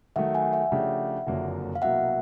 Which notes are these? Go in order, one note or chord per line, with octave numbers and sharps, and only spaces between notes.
D#3 F#3 A3 E5 F#5
F#5 G#5
E5 F#5
C#3 F3 A3 D4 G4
F#1 F2 D3 F#3 A#3
F5
C2 B2 F#3 A#3 E5 F#5